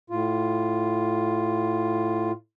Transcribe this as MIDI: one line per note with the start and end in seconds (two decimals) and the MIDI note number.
0.10 2.31 45
0.10 2.31 65